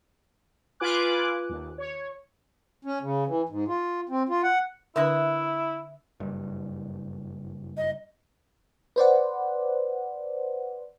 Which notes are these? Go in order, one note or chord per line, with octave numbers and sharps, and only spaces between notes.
F4 B4 G#5 D6 F#6
D#2
C#5
C#4
C#3
E3
G#2
F4
C4
F4
F#5
D3 D4 E4 B4 E5 D#6 F#6
F#1 G2
D#5
B4 C5 D5 F#5